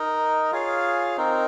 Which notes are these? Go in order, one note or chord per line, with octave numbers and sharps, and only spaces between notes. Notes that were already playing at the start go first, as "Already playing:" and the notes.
Already playing: D#4 A#4 D#5
F4 G#4 C#5 F5
C4 D#4 A#4